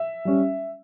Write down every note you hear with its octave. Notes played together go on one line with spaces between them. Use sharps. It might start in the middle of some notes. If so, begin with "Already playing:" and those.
Already playing: E5
G3 C#4